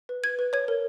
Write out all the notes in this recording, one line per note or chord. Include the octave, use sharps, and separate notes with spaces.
B4
B4 G#6
B4
C#5 G#6
A#4